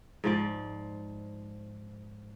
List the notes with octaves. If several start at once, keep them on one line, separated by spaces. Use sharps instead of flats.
G#2 F3 D5